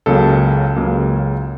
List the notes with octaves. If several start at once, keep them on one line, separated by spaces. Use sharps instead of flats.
C#2 C#3 F#3 A#3 A4
C#2 C#3 F#3 A#3